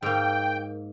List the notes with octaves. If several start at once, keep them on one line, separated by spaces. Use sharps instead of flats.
G#2 A#3 G5